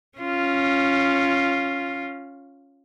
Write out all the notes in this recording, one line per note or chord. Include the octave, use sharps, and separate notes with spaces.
C#4 F4